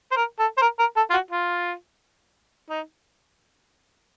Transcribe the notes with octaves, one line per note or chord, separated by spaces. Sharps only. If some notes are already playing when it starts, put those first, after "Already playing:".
C5
A#4
A4
C5
A#4
A#4
A4
F4
F#4
F4
D#4